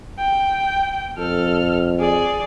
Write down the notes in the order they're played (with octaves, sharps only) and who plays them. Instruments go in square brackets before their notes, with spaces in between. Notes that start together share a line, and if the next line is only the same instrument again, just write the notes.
[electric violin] G5
[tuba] F2 [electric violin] A4 F6
[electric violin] G#4 D5